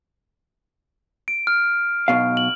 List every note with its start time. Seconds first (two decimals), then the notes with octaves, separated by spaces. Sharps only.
1.28 D7
1.47 F6
2.08 B1 B2 F5
2.37 F#7